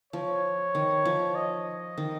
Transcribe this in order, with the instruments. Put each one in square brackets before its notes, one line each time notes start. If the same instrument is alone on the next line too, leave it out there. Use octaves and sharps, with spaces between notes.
[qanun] F3 [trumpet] C#5
[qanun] D#3
F3
[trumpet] D#5
[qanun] D#3